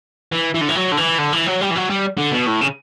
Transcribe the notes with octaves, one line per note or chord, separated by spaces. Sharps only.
E3
E3
D3
E3
F#3
D3
E3
D3
E3
F#3
G3
E3
F#3
G3
D3
B2
A2
C#3